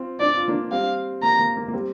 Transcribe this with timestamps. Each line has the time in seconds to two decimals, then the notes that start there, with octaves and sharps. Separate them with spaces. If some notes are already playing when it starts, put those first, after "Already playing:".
Already playing: C4 F4
0.20 D4 D5
0.35 F4
0.48 A#3 D4
0.72 G3 C4 F5
1.23 A#3 A#5
1.39 A#3
1.57 A#3
1.68 A#3
1.73 G3 C4